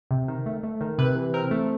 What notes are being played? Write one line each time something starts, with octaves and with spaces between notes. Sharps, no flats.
C3
D#3
A3
A3
D#3
C3 B4
E3
C4 A#4
A3